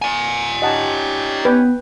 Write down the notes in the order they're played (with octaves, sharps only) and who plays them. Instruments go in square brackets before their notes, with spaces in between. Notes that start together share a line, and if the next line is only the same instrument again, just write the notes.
[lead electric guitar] D5 G#5
[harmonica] C#4 D#4 G4 [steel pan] D#5 F#5 A5
[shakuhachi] B3 [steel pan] B4 G5